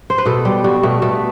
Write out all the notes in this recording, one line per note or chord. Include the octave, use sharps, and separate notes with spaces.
C5
B4
B2 A4
G3 G4
G3 F#4
B2 A3
B2 A3